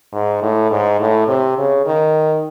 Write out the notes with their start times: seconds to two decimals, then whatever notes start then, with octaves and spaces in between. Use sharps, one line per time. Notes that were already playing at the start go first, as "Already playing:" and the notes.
0.13 G#2
0.42 A2
0.71 G#2
1.00 A2
1.28 C3
1.58 C#3
1.86 D#3